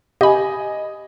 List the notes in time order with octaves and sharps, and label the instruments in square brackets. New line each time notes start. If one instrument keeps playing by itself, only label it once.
[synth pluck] G4 B5 [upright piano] D#5 G#5